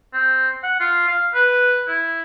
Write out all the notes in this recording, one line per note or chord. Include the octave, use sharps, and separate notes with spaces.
C4
F#5
F4
F5
B4
E4